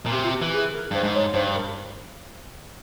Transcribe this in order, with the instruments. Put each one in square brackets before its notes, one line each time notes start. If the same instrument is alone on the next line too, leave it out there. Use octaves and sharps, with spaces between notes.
[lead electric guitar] A#2
[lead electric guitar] C3 [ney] G4
[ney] F4
G4
[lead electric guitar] E3
[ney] G#4
A#4
[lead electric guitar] G2 [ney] C5
[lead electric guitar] G#2
[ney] C#5
[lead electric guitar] G2 [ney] C5
[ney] A#4